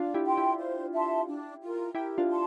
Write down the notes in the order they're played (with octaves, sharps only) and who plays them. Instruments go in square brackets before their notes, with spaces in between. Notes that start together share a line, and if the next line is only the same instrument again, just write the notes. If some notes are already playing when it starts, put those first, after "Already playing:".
Already playing: [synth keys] D4 F4
E4 G4
[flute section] G5 C6
[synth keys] E4 G4
[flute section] C5
E5 A5 C6
D4
F4 A#4
[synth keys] E4 G4 [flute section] A#4
[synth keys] D4 F4
[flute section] A5 C6